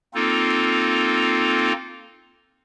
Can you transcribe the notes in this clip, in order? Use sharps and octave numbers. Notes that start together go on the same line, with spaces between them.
A#3 C4 D#4 F4 A4